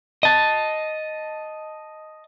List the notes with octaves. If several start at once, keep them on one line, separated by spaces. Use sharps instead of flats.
D#5 A5